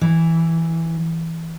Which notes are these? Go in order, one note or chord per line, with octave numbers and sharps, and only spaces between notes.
E3